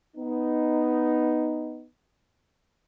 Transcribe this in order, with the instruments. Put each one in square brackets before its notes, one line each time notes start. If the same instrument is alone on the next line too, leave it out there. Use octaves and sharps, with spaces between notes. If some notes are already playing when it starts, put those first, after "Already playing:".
[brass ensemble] B3 D#4